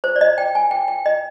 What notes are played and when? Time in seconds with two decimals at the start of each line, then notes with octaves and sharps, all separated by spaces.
0.04 C5
0.16 D5
0.21 D#5
0.38 G5
0.55 G#5
0.71 G5
0.88 G5
1.06 D#5